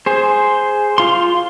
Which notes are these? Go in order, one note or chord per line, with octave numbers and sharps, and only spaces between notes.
G#4 C5
F4 C6